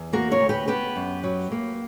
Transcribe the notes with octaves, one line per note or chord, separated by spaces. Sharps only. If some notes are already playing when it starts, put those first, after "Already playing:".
Already playing: E2
A#3 F#4 A#4
A#4 C#5
D2
G4 B4
B3 G4 B4
F#2
F#3
A#3